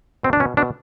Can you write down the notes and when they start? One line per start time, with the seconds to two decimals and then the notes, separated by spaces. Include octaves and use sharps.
0.23 B2 C4
0.33 D4
0.40 B2 C#4
0.57 B2 D4